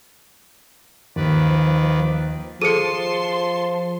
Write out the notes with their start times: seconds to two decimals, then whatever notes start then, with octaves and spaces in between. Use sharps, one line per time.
1.16 D#2 D#3 F3 B4 D5
2.62 F3 G#4 A4 C5 A5 C6 C#7 D#7